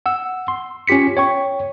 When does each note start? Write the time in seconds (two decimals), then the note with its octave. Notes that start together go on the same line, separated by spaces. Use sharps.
0.06 F#5 E6
0.48 C6
0.87 C#4 F4 G4 B6 C#7
1.17 C#5 G5 C#6